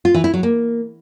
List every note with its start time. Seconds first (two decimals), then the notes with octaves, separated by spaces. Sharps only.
0.05 F4
0.14 E3
0.24 E4
0.34 F#3
0.43 A#3